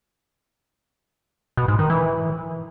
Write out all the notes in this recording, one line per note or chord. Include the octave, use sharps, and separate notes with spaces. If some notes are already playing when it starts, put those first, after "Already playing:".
B2
G#2
D#3
E3